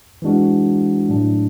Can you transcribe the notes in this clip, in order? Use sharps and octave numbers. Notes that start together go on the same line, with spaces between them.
E3 G#3 D4 F#4
A2 F#3 A3 D4